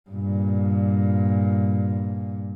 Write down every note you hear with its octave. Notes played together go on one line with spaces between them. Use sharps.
G2 A#2